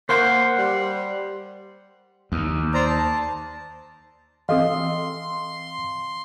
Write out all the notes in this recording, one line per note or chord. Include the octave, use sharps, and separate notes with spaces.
A#3 C5 F#5 C6
G3
D#2
C5 D5 A#5
A5
E3 C4 A4 D#5 F5 C6